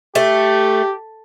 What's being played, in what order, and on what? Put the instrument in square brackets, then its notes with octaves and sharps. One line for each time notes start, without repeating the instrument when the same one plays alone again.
[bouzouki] A3 [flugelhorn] G4